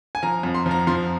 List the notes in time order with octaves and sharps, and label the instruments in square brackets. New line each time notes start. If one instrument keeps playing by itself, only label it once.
[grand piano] G#5
F3 A#5
F2
C6
F3
A#5
F3 C6